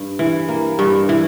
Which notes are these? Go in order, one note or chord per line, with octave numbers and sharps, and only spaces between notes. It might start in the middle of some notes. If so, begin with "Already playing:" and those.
Already playing: G2
E3
A#3
G2
E3